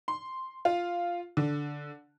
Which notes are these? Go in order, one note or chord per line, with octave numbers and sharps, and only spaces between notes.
C6
F4
D3